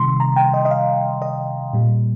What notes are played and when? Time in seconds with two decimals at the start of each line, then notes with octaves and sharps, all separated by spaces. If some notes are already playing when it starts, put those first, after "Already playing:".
Already playing: C3 D#3 G3 C6
0.20 A#5
0.36 G5
0.54 D#5
0.65 D#5
0.71 F5
1.22 D#5
1.73 A#2 G3